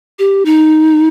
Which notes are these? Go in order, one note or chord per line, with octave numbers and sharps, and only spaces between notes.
G4
D#4